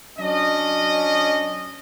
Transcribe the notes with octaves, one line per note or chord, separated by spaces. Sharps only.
F#3 C#4 D4 D#5